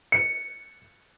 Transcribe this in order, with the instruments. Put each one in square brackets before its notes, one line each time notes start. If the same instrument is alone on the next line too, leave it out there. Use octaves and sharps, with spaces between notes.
[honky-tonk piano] C#7